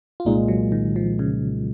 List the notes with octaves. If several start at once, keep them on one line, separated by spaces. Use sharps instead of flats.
F4
C2 A#2 G#3 D#4
F#3
D#3
F3
C#3